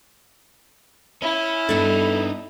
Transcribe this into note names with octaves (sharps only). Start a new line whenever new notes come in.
C#4 E4
G2 B3 D4 D#4 A4